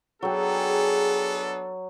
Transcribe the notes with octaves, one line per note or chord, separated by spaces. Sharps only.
F#3 B3 D4 G#4 A4 G5